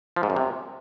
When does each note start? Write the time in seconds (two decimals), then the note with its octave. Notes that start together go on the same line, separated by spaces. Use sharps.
0.16 F3
0.23 G#2
0.30 F#2
0.36 C3